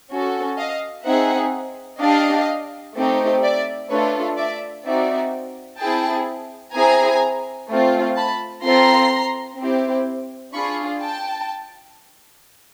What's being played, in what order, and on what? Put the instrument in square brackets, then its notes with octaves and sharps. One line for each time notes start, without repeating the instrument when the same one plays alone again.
[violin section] C#4 F#4 A4
D#5 F5
C4 D#4 G#4 E5 F#5
D4 G4 D#5 F5
A3 C4 D#4 G4
D5 E5
A3 D4 F4 A4 B4 C#5
D5 E5
C4 D#4 F#4 D5 E5
C4 E4 G#4 G5 A5
C4 E4 G#4 G#5 A#5
A3 C4 F4
A5 B5
C4 F4 A4 A#5 C6
C4 E4 G4
D4 F4 G#4 B5 C#6
G5 A5